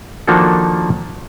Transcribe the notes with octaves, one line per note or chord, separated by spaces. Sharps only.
D#3 F3 A#3 D4 F#4 A4